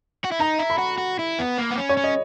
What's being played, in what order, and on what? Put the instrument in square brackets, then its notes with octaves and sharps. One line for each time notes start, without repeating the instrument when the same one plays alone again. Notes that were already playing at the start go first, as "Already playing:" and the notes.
[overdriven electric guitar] F#4
E4
[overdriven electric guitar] D#4 [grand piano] A#5
[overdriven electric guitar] E4
[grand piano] B5
[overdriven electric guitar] F#4
F#4
E4
B3
A#3
B3
C#4
[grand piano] C#5
[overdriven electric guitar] C#4
[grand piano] D#5